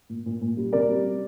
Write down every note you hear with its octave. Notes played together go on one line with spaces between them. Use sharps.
A#2
A#2
A#2
G3
C3 A#4 D5
G3
G3